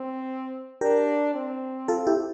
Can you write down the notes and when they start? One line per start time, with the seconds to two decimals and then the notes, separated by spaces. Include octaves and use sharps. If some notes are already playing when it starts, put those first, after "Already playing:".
Already playing: C4
0.81 D4 G4 A#4
1.35 C4
1.88 F4 A4
2.07 E4 G4